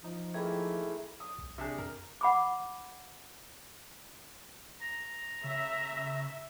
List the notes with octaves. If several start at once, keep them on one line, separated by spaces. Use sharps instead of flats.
F3 D#4
D#3 E3 A3 A#3 G#4
D#6
B1
C3 D4 G#4
F2 A#4
F#5 B5 D6
A#5
C#3 E5